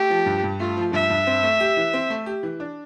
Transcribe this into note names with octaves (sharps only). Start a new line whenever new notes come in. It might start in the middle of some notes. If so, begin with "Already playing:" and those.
Already playing: A3 G4
F3
G2
G2
A3 F4
F3
G2 E5
G2
C4
A3
G4
E3
C4
A3
G4
E3
D4